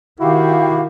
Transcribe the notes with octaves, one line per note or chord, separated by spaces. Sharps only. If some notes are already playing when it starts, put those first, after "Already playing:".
D#3 E4 F#4 G4 F5